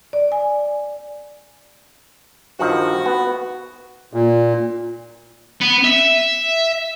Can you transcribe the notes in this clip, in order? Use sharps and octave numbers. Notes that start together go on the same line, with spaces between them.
D5
G#5
G2 D#3 F3 F#4
B3
A#2
B3
E5